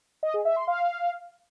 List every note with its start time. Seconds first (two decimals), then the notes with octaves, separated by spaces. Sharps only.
0.23 D#5
0.34 G#4
0.45 E5
0.56 C6
0.68 F5